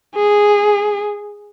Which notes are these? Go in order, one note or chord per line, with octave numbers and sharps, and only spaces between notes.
G#4